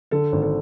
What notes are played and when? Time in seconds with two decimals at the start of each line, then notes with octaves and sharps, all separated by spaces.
0.11 D3 A4
0.32 G#1
0.42 A4